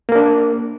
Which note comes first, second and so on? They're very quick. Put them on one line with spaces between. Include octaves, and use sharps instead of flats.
A#3 A#4 D4